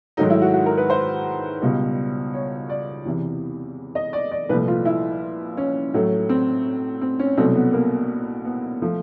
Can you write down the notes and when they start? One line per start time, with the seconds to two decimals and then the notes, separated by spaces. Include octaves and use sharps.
0.17 G#2 D#3 F#3 A3 D#4
0.30 E4
0.42 F#4
0.54 F#4
0.66 A#4
0.78 B4
0.90 C5
1.62 C#2 B2 G3
2.34 C#5
2.69 D5
3.05 E2 C3 E3
3.95 D#5
4.13 D5
4.32 D5
4.49 C2 A#2 F3 A3 B4
4.68 F4
4.85 E4
5.57 C#4
5.94 A2 F#3 A3
6.29 C4
7.01 C4
7.19 C#4
7.37 C2 B2 F#3 A3 C4
7.55 B3
7.73 A#3
8.45 B3
8.82 F3 A3